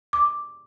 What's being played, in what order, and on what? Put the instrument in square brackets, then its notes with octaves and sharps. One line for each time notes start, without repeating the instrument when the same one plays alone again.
[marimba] D6